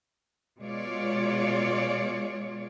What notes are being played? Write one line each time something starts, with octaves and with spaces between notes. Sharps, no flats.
B2 G#3 F4 C#5 D5